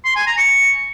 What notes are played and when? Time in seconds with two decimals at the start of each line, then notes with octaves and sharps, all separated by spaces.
0.05 C6
0.16 G#5
0.27 A#5
0.38 C#6